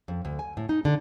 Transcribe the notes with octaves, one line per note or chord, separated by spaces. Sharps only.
F2
D2
G#5
A2
D#4
D3